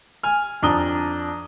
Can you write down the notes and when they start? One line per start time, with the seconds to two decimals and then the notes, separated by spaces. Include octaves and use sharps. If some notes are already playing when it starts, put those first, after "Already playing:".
0.23 G#5 F6
0.63 F2 D4 A#5 D#6 G7